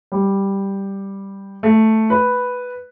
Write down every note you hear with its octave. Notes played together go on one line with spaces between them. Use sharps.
G3
A3
B4